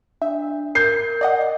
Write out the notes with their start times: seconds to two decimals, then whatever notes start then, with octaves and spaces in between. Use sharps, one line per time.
0.22 D4 E5
0.75 A#4 G6 C7
1.21 D5 D#5 F#5